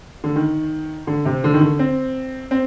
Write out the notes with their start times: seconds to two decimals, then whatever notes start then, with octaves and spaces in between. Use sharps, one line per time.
0.24 D3
0.36 D#3
1.07 D3
1.25 C3
1.44 D3
1.54 D#3
1.61 D3
1.79 C4
2.51 C4